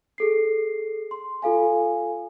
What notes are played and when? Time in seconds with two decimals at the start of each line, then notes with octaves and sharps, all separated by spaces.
0.18 G#4 A4 C7
1.11 C6
1.42 F4 A4 F5 G#5